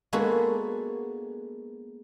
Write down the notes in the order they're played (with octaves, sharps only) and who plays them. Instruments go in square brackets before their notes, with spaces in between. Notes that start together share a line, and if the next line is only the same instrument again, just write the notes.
[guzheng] G#3 A#3 B3 D4 F#4 A4